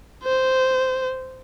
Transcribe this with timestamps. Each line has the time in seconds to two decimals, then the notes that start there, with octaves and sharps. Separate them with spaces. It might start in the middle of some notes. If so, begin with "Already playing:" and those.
0.24 C5